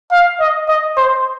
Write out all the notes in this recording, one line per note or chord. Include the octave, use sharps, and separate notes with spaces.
F5
D#5
D#5
C5